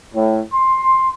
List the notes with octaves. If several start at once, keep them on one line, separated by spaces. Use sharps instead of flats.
A2
C6